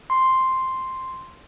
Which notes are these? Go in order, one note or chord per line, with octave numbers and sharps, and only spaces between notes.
C6